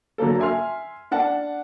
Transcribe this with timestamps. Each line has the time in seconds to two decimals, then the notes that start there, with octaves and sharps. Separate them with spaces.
0.18 D3 F#3 A#3 A4
0.40 E5 G#5 C6 F6
1.11 D4 F#5 A5